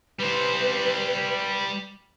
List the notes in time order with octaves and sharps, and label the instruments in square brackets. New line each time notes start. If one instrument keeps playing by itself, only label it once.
[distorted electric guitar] G3 C5 [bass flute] B4